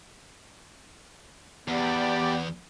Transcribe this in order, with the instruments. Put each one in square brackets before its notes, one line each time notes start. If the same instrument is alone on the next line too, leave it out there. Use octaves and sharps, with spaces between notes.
[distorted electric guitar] E2 [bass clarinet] B3 [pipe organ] G4 D5